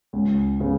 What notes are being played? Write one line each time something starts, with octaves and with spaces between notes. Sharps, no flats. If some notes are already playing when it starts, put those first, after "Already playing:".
C#2
C#3 G#3 B3